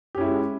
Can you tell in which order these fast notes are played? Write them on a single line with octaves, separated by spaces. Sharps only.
G4 C#4 E4 G#3